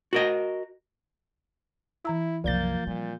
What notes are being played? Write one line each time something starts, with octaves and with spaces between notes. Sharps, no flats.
F#4 A#4 D#5
E3 E4 A#5 E6
C2 F#2 F3 A#3 D5 G6 A6
A#2 G3 C4